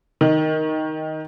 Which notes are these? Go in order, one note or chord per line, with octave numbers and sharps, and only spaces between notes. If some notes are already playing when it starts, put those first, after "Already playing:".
D#3